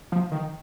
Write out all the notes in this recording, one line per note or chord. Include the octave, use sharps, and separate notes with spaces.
F3
D#3